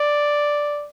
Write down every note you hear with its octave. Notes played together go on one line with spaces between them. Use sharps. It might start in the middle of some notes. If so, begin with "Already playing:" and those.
Already playing: D5